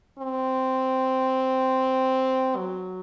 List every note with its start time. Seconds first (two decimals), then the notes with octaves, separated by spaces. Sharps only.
0.19 C4
2.57 F#3